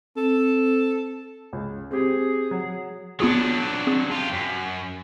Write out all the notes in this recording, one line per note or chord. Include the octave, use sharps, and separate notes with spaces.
C4 A4
C#2
C4 G4 G#4
F#3
F#3 B3 D4 F4 G#4
C4 G#4
F4 G4
F#2